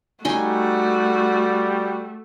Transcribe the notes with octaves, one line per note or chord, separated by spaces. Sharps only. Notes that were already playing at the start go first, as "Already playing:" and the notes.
G3 A3 D#4 F#4 G#5 C6